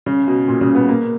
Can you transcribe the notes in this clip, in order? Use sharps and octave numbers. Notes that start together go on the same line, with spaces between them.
C#3
B2
A#2
C#3
B3
A#3